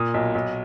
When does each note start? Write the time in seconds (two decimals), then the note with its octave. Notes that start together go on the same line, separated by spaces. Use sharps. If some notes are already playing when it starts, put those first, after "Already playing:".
Already playing: A#2 D#6
0.14 B1
0.35 B1